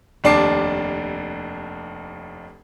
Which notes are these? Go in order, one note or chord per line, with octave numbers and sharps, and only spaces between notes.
F1 D#2 D4 A5 D6 C7